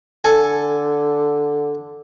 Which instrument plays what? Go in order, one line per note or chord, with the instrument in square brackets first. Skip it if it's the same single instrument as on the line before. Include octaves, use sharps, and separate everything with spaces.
[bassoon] D3 [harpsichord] A4 G#5